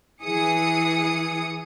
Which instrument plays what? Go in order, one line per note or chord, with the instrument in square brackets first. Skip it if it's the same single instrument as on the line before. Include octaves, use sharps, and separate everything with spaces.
[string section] E3 G#4 D#6 C#7